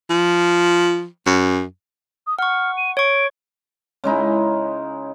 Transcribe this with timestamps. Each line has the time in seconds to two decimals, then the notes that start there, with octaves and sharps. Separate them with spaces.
0.10 F3
1.27 F#2
2.27 D#6
2.39 F#5 C#6 F6
2.77 D#7
2.97 C#5 C#6 D7
4.04 C#3 G#3 D#4 E4